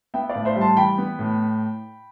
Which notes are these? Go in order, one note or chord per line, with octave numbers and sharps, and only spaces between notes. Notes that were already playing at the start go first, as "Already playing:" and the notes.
B3 E5 G5
D5 F5
A2
C5 E5
G3
A5 C6
E3 G5 B5
B3
A2